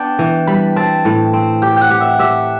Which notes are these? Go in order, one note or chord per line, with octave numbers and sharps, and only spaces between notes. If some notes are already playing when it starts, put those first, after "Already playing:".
Already playing: B3 D4 G5 A5
E3
G3 B5
C4 A5
A2
C4
G4 G5
F#5 G5
G4
E5
G4 E5